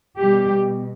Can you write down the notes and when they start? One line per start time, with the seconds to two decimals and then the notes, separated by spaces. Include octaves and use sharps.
0.18 B2 G3 G4